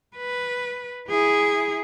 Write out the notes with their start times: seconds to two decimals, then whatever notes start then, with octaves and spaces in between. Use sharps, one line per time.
0.17 B4
1.09 E4 G#4